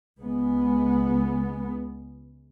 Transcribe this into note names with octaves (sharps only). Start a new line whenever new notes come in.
C#2 G#3 B3